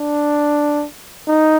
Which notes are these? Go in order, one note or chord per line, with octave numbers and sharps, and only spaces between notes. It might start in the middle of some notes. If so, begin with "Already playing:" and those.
Already playing: D4
D#4